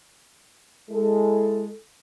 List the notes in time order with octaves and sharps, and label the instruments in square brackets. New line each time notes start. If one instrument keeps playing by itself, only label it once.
[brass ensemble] G#3 E4 A4